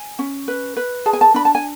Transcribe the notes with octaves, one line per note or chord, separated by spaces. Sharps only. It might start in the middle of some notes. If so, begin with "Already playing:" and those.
Already playing: G#5
C#4
B4
B4
G#4 A5
G#5
A5
D4 B5
A5
G#5